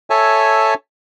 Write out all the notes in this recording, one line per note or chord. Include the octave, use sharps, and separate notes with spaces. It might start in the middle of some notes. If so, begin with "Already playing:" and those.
A4 C#5 E5 G#5 A5